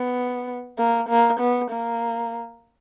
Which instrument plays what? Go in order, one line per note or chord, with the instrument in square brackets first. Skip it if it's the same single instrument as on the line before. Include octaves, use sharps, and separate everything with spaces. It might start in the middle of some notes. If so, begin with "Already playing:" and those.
Already playing: [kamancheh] B3
A#3
A#3
B3
A#3